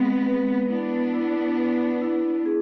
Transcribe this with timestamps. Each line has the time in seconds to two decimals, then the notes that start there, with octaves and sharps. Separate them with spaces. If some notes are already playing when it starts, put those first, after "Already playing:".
Already playing: G#3 B3 C4
0.26 B4
0.69 B3 D4 E4
1.14 E4
1.57 B4
2.02 E4
2.46 G#4